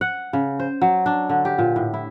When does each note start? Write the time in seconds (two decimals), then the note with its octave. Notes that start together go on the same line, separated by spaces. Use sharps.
0.01 F#5
0.33 C#3
0.59 C5
0.82 F#3
1.06 D4
1.29 D3
1.45 G4
1.58 A#2
1.76 A2
1.94 E4